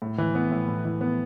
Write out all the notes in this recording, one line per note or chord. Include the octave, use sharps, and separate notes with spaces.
A2
E3
B3
A2
A2
E3
B3